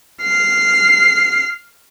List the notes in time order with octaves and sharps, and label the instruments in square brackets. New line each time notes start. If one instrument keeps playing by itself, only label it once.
[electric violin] F6 C7